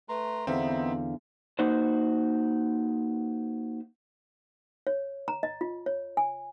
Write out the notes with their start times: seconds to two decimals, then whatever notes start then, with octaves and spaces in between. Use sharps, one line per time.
0.09 A3 B4 A#5 C6
0.47 E2 D3 B3 C4 D#4 E5 F5
1.59 A#3 D#4 F#4 B4 C5
4.87 C#5
5.28 A#5
5.43 D#5
5.61 F4
5.86 C#5
6.17 G#5